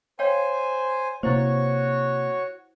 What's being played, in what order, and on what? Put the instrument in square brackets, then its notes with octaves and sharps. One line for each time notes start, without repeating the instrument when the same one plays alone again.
[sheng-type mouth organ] C5 G#5 [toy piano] C#5 F5 G5
[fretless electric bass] C3 A#3 [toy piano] E4 C5 [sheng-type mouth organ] F#4 C#5 C#6